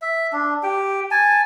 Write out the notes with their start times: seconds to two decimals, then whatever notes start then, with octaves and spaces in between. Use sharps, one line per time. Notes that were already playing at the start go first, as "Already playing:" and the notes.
0.02 E5
0.33 D4
0.63 G4 G5
1.11 G#5 A5